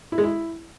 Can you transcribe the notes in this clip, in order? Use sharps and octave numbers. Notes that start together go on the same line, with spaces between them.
E4
G#3
E4